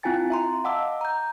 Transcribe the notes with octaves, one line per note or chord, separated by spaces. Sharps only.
C4 E4 F4 G5 G#5 A6
E5 A#5 C6
D#5 F5 F#5 A5 D6 E6
A#5 G6